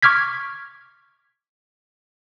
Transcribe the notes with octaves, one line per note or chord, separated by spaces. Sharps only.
C#6 D6 F6 G#6 B6